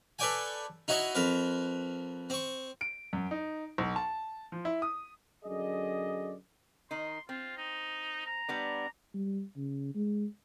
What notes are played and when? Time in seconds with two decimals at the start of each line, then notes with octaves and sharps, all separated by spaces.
0.19 A4 B4 C#5 D5 G5 G#5
0.88 D#4 E4 F#4 C#5 D#5
1.15 F2 A#4 B4
2.30 C4 C#6
2.81 D7
3.13 F#2
3.31 D#4
3.78 B1
3.96 A5
4.52 F3
4.65 E4
4.82 D#6
5.44 F#2 D3 G#4 D5 D#5
6.91 D#3 D#4 C6
7.29 C4 F4
7.57 D#4
8.26 A#5
8.49 G3 B3 D4
9.14 G3
9.57 C#3
9.95 G#3